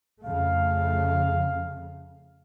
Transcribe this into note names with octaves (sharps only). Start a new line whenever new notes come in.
F2 C#3 A3 F5